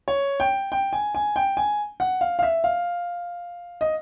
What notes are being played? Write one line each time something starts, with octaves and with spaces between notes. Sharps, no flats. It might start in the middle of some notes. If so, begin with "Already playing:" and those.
C#5
G5
G5
G#5
G#5
G5
G#5
F#5
F5
F5
E5
F5
D#5